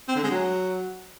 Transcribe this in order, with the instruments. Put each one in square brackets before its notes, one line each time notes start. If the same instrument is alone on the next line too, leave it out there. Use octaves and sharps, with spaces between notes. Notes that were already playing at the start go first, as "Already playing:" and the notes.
[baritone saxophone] C4
D3
G#3
F#3